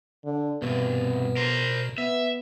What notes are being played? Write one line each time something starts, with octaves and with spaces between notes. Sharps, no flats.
D3
C2 G2 B2 B3
A#4 C5
B3 E5